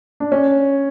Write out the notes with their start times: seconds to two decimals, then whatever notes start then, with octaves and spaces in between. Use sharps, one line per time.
0.20 D4
0.32 C#4